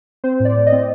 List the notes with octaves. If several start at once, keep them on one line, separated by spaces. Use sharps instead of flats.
C4 C5
A2
D5
A2
D#5
C4